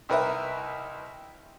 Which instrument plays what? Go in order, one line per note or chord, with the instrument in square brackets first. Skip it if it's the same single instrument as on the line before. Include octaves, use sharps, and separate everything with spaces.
[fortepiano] C2 D#4 A#4 B4 D#5 E5